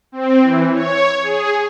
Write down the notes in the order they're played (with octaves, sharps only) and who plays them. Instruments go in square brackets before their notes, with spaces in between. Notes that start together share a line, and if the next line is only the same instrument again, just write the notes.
[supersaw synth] C4
E3
C#5
G#4